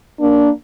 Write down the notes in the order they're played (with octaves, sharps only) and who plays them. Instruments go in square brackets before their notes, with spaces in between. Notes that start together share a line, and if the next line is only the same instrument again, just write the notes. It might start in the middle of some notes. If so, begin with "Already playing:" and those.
[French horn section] A#3 D4